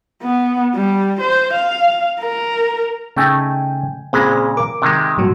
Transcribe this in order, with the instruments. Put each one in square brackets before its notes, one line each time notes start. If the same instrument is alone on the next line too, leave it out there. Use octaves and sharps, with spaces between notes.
[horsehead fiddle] B3
G3
C5
F5
A#4
[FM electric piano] C#3 G5 G#5 [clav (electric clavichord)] A3 D#4
[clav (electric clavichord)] A#2 C#3 G#3 [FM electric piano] C4 G#4 B5
[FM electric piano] A#4 D6
[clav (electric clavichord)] C3 D#3 G#3
[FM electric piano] G2 A#2 F#3